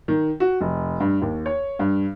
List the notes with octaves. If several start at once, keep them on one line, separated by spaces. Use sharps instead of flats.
D#3
F#4
F1
G2
D#2
C#5
G2